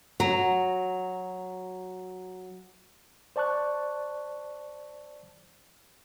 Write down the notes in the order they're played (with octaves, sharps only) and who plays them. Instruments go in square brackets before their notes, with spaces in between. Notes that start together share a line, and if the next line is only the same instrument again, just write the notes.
[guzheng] F#3 [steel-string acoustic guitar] A#5
[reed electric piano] C5 D5 A5 C#6 F#6